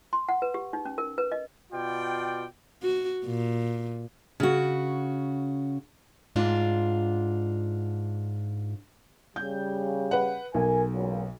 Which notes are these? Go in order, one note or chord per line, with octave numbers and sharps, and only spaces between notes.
C6
F#5
B4
G4
D#4
C#4
A#4
B4
D#5
B2 F4 D5 G5
F#4
A#2
C#3 F#4
G#2 D4 F4
C#3 G3 G6
B4 F#5
B1 A#4 G#5
C#2 A#2 F#3